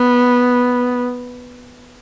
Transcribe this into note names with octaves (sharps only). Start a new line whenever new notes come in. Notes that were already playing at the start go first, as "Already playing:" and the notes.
Already playing: B3